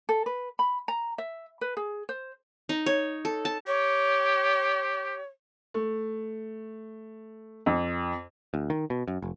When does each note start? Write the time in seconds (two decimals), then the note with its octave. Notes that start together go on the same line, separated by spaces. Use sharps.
0.09 A4
0.26 B4
0.59 B5
0.88 A#5
1.18 E5
1.61 B4
1.77 G#4
2.09 C5
2.69 D#4
2.86 C#5
3.25 A4
3.45 A5
3.67 G4 C#5
5.74 A3
7.66 F2
8.54 D2
8.70 D#3
8.90 B2
9.08 F#2
9.22 F1